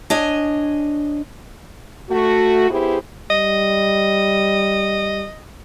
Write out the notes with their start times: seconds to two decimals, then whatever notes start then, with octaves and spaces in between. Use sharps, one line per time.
0.10 D4 C#5 D#5 G#5
2.10 A3 F#4
2.70 B3 E4 G4 G#4 C5
3.30 G3 D#5